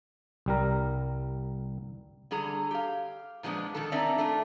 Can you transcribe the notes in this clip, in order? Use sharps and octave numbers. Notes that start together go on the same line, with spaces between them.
C2 G3 A#4
D3 G3 G#4 A#5
G4 F5
A#2 F3 G#3 B3 D4
B2 D#3 A4
C4 D4 D#4 A#4 D5 E5
A3 D4 F4